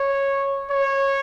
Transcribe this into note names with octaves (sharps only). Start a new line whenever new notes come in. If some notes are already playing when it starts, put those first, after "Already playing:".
Already playing: C#5
C#5